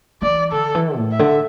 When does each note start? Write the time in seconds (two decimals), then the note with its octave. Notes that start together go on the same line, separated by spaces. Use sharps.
0.22 E3 D5
0.52 D3 A4
0.75 E3
0.97 A2
1.11 E5
1.19 D3